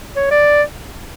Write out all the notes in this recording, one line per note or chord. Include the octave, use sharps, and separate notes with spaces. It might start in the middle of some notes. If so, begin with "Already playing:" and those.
C#5
D5